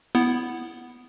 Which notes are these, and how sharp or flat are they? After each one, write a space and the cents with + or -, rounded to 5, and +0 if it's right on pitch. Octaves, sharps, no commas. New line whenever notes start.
B3 +0 E4 +0